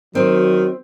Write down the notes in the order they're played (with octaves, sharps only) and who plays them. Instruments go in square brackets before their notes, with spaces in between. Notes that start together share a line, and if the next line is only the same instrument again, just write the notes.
[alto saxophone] D#3 [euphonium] F#3 [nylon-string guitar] C4 [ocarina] F#4